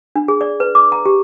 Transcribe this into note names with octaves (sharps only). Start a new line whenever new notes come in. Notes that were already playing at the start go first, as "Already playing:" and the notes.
D4
G#4
D5
B4
D6
A#5
G4